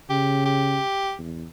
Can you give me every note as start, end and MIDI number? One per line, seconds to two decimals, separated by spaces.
0.10 0.79 49
0.10 0.41 67
0.45 1.15 67
1.19 1.46 40